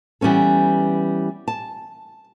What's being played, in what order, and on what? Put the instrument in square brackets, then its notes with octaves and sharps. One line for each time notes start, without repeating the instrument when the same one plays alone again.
[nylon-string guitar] E3 G3 B3 C#4 A4
A5